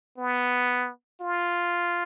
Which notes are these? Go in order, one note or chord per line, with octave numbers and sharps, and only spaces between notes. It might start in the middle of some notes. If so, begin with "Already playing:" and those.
B3
F4